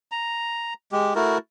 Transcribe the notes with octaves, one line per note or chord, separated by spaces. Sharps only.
A#5
G#3 G4
A3 E4 F#4 A#4